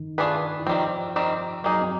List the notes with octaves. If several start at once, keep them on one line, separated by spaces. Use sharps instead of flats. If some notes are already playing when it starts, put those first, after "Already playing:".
Already playing: D#3 D#4
A3 D4 F4 G#4 B4
E4
D#3 F3 G3 C4 F4
D#3 G3 C4
F#3 A#3 D#4 F#4 G#4
C4